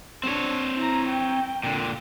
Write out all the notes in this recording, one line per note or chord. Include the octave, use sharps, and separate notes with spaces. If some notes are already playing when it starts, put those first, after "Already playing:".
C4 D4 C#5
E4 A#5
G5
A#2 D3